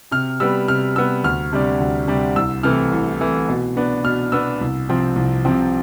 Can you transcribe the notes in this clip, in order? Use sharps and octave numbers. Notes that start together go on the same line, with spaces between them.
C3 F6
G3 B3 E6
C3 F6
G3 B3 E6
D2 F6
C3 G3 D4
D2
C3 G3 D4
C2 E6
C3 E3 A3 F6
C2
C3 E3 A3
B2
B3 D4
B2 F6
B3 D4 E6
C2
C3 F3 C4
C2
C3 F3 C4